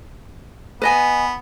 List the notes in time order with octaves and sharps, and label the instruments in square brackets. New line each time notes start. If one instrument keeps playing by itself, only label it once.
[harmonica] B3 [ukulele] B4 D#5 G#5